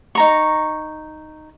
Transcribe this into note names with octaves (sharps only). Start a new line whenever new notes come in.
D#4 A#5 C#6